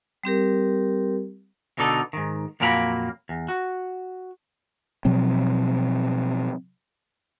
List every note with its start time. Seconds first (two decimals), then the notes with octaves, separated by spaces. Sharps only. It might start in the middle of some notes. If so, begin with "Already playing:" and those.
0.24 G3 C4 G4 A#4
1.78 B2 D3 D#4 A4
2.13 G#2 D#3
2.60 F2 A#2 F#3 A#3 A#5 B5
3.29 E2
3.48 F#4
5.05 B2 F3 F#3 C4